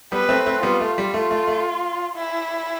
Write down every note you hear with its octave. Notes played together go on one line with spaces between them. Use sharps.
G3 B3 B4
A3 C4
A3 C4
G3 B3 F4
A3
G3
A3 F4
A3
A3
E4